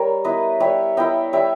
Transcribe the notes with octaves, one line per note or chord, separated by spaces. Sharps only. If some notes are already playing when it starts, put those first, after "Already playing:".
Already playing: G3 A#4 C#5
B3 E4 B4 D#5
G3 C#5 E5
B3 E4 D#5 G5
G3 C#5 E5